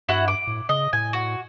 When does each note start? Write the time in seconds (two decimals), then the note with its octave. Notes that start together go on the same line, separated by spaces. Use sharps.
0.09 G2 E4 F#4 F#5
0.28 D6
0.47 A2
0.69 C#3 D#5
0.93 A2 G#5
1.13 F#4